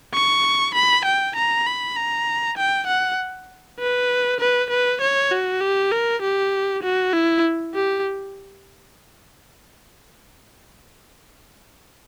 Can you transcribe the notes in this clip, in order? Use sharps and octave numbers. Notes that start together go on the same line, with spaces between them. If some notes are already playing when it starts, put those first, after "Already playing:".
C#6
B5
G5
A#5
B5
A#5
G5
F#5
B4
B4
B4
C#5
F#4
G4
A#4
G4
F#4
E4
G4